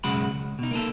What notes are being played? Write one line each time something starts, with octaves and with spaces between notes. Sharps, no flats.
B1 F#2 C#3 G#3 F#4 B5
C#2
B2 D#4
A#3 D#4 A4